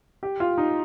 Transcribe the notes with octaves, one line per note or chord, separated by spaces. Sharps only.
G4
F4
D#4